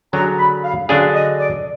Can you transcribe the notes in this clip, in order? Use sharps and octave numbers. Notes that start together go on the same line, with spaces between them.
D3 F#3 D4 G#4 A#5
B5
F5
D3 F#3 D4 G#4 F5
D#5
D5